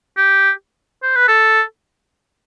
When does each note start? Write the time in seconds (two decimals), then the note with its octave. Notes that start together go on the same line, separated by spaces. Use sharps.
0.17 G4
1.03 C5
1.15 B4
1.28 A4